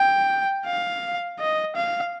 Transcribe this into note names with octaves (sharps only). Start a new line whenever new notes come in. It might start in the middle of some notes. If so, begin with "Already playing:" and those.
Already playing: G5
F5
D#5
F5